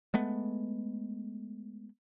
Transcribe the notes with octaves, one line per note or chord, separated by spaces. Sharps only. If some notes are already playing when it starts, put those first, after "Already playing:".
G#3 A3 B3